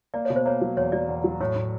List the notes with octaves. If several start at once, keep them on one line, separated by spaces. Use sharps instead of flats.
A#3 D5
B2 C#5
C5
A#3 C#5
F#3
E2 C#5
F#3 D5
E2
F#3
A2 C#5
A2